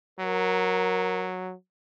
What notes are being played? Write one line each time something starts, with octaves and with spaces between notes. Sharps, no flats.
F#3 A#4